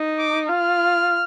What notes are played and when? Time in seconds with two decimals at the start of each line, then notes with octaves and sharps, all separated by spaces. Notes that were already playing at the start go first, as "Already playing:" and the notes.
Already playing: D#4
0.19 D6
0.49 F4 F6